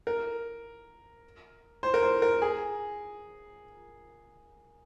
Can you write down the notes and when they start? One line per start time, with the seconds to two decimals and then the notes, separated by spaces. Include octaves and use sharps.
0.07 A#4
1.83 C5
1.94 A#4
2.03 C5
2.22 A#4
2.42 G#4